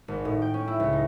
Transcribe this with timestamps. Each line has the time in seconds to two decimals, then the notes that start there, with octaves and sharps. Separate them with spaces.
0.08 G#1
0.25 A2
0.42 G5
0.54 C#4
0.68 E4
0.80 C#2
0.93 D#4